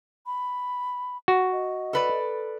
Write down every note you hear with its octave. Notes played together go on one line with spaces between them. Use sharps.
B5
F#4
D#5
A4 B4 D5